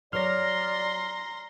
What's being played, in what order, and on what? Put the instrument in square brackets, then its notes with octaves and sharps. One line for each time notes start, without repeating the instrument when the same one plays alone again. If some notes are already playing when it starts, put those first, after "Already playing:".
[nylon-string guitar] F#3 A#4 C#5 [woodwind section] D5 [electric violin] A#5 C6 [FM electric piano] F6 A#6